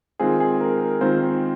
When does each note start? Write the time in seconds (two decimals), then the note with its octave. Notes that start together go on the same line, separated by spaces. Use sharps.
0.19 D#3 G#3 C4 F4 G#4
0.40 G#4
0.61 A#4
0.81 A#4
1.01 D#3 G#3 C4 F4 C5